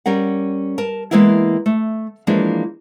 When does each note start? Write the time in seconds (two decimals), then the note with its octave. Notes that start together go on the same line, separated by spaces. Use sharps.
0.06 G3 C#4 A#4 F#5
0.78 A#4 A5
1.11 E3 F3 G#3 A#3 B3 E4
1.66 A3
2.27 E3 F3 G#3 A#3 D4